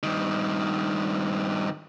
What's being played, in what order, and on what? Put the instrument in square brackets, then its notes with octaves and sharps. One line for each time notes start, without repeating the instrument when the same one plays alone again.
[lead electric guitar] G2 D#3